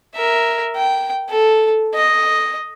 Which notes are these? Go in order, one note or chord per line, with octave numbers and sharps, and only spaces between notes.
A#4 E5
G5
A4
D#5